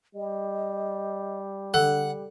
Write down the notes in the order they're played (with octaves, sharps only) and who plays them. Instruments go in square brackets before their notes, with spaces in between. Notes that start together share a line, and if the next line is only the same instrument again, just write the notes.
[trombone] G3 [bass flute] D#5
[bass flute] D3 [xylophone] A4 [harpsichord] F#5